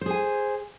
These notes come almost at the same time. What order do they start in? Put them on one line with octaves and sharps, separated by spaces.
C5 G#4 G#5